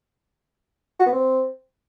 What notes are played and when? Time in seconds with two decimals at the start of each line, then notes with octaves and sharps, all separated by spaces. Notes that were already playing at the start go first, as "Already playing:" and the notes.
0.99 F#4
1.06 B3
1.12 C4